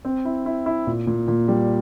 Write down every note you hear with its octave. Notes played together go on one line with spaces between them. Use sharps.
C4
E4
E4
E4
A#2
A#2
A#2
G3